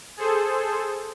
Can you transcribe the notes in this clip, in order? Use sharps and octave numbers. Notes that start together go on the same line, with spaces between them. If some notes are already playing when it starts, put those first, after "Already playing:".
G#4 A4 C5